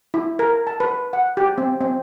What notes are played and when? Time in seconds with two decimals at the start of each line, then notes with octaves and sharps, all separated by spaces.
0.14 E4
0.39 A#4
0.67 A5
0.80 B4
1.13 F#5
1.37 G4
1.58 C4
1.81 C4